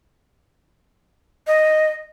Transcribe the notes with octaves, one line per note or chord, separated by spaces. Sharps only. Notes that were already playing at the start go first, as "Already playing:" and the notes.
D#5